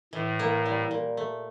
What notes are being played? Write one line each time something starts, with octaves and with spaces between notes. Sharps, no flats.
A2 E3
A#3
G3
A#2
A3